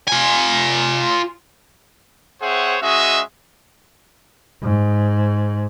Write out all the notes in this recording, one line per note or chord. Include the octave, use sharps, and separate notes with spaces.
F4 G#5
C4 G#4 C5 C#5 E5 F#5
G#3 C#4 F#4 G#4 D#5 E5
G#2